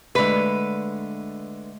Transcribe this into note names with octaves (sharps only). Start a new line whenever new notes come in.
D3 G#3 A3 B4